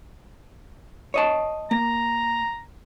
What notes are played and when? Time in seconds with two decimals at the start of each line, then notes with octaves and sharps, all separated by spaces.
1.14 C#5 D#5 A5
1.71 A#3 A#5